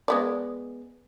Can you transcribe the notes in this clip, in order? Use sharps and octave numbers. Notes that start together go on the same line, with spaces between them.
G#3 B3 D5